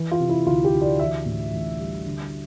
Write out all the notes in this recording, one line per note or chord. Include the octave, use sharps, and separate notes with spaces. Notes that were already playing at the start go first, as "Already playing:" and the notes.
Already playing: E3
F4
C3
E4
D2 F4
G4
D2
D5
E3 E5
A2
A1
G3
D3